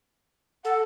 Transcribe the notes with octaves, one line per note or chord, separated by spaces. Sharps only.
A4 F#5